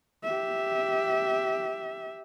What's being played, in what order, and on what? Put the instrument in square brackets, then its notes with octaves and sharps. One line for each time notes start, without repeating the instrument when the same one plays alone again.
[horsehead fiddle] G4 E5